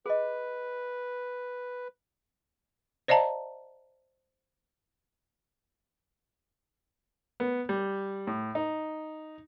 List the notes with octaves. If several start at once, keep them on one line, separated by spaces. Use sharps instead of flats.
G#4 B4 D#5
C5 D5 D#5 F5 A5 A#5
B3
G3
A2
D#4